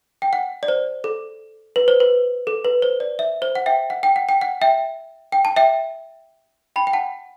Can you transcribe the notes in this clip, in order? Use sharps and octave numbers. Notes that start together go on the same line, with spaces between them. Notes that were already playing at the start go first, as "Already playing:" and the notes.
G5
F#5
D5
C5
A4
B4
C5
B4
A4
B4
C5
D5
E5
C5
F#5
E5 G5
F#5
G5
F#5
G5
F#5
E5 G5
G5
A5
E5 G5
G5 B5
G5
F#5 A5